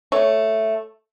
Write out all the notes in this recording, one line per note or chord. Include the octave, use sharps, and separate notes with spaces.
A3 C#5